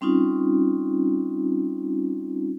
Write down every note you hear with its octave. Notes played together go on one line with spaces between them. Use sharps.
G3 C4 C#4 D#4 F4